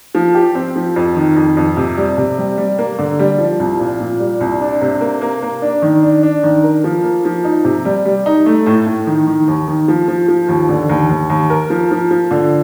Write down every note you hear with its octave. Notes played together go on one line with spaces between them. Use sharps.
F3
G4
C4
F3
F2
D#3
F2
F2
C3
G3
C3
G3
G3
A#3
D3
G3
F3
C2
A#2
A#2
G3
C2
D4
C3
A#3
A#3
A#3
D4
D#3
D4
D4
D#3
A#4
F3
A#3
F3
D#4
C3
G3
G3
D#4
A3
A2
A2
D#3
D#3
D#2
D#3
F3
F3
F3
D#2
D3
D#2
D#2
D#2
A#4
F3
F3
F3
D3